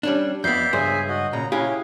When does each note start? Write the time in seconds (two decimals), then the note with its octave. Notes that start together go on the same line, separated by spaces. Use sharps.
0.03 G3 C#4 D4
0.44 F2 B3 D5 E5 D6 G6 C7
0.73 C#2 G2 G#4 C5 E5 G#5
1.09 F#4 D#5
1.33 A#2 C#3 A#5
1.52 C#4 E4 G4 G#4 F5